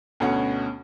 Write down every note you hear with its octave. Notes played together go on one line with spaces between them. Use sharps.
D2 B2 C#4 F#5